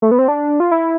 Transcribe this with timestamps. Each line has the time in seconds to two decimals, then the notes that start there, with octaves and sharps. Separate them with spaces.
0.02 A3
0.11 B3
0.19 C4
0.28 D4
0.60 F4
0.71 E4